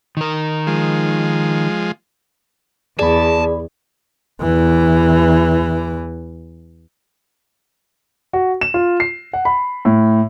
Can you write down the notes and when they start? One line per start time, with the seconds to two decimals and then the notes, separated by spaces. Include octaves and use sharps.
0.17 D#3 A#4
0.67 F3 G#3
2.99 E2 G#4 D5 A5 B5
4.41 E2 E3
8.33 F#4
8.61 E7
8.74 F4
9.00 C7
9.33 F#5
9.45 B5
9.85 A2